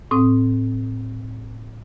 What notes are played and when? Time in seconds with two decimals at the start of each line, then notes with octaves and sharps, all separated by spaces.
0.11 A2 C4 D#6